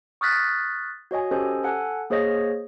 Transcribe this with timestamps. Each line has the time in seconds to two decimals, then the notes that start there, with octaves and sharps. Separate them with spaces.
0.21 C#6 D#6 F6 F#6 A6 B6
1.11 F#4 C#5 D#5 G#5
1.31 C#4 G4 A4 C5 D#5 G#5
1.63 A4 F#5 G#5
2.10 A#3 G#4 C5 C#5 D#5 A#6